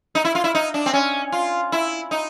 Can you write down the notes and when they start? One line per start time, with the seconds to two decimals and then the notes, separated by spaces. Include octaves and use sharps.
0.15 D#4
0.25 E4
0.35 F4
0.44 E4
0.55 D#4
0.74 D4
0.86 C4
0.93 C#4
1.32 F4
1.72 E4
2.11 D#4